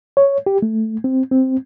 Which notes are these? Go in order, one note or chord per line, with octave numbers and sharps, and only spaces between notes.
C#5
G4
A3
C4
C4